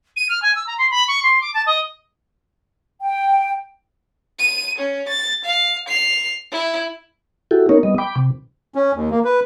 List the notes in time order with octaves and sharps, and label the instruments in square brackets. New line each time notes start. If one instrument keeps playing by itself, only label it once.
[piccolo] D#7
F6
G#5
E6
A#5
C6
B5
C#6
C6
D6
A5
D#5
[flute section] G5
[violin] D#7
C#4
A6
F5
C7 F7
E4
[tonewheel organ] E4 F#4 G4 A4
B3 C#4 D#4 A#4 C#5
G3 B3 D#5
G5 B5 D6
C3
[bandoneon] C#4
D#2
A#3
B4